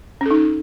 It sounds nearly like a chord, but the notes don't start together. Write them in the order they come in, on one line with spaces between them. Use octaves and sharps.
C#4 A4 D#4